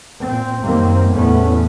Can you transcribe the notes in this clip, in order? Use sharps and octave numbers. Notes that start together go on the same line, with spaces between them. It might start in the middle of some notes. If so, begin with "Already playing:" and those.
A#2 C4
F#2 D#3 G3 A#3 C4
E2 A2 G3 A3 B3 C#4